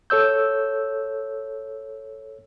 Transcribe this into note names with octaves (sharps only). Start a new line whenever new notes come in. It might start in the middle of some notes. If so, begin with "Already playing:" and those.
A4 C#5 E6 G6